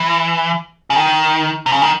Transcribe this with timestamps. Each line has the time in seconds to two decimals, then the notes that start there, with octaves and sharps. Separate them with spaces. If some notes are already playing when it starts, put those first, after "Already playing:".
Already playing: E3
0.90 C#3
0.97 D#3
1.66 C3
1.72 C#3
1.82 D#3